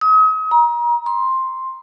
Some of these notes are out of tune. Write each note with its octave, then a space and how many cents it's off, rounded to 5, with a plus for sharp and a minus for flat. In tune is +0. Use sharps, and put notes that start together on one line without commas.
D#6 +40
A#5 +30
C6 +5